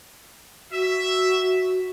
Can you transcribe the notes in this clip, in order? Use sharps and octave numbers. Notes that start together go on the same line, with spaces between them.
F#4 E5